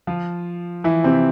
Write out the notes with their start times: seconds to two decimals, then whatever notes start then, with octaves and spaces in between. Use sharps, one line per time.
0.07 F3 F4
0.84 E3 E4
1.04 C3 C4